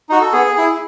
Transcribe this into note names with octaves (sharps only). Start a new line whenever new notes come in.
D#4 F#4
A4
B3 G#4
E4 G#4